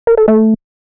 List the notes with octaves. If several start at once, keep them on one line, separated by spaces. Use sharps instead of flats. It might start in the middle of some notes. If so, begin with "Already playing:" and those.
A#4
A4
A3